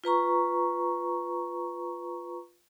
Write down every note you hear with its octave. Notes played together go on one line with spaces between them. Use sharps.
F4 B4 A#5 C#6